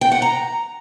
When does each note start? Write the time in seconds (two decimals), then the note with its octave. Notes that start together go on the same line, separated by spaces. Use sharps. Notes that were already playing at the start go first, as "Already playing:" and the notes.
0.01 G5
0.12 F#5
0.22 A#5